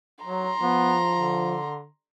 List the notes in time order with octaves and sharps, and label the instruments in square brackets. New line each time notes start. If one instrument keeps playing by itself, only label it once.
[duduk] F#3 [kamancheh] A#5 C6
[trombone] F3 [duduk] B3
[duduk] D3